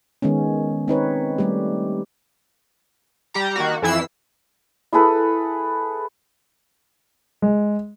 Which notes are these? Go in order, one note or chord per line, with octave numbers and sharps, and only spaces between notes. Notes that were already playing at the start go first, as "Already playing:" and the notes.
D#3 G#3 B3 C#4
C4 D#4 B4 C#5
G3 A3 G4
G3 G4 A#5
D#3 A#3 F#4
F2 E3 E4 E6 C7
E4 G#4 A4 B4
G#3